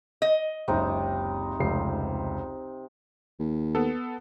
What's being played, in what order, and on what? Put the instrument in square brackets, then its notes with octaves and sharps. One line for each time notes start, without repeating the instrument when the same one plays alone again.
[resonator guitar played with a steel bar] D#5
[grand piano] F#1 C#2 [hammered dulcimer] C3 C4 D#4
[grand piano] F1 C#2 C7
[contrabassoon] D#2
[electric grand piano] B3 A4